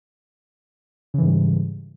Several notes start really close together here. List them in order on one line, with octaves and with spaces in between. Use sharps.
C#3 E3 G#2 G3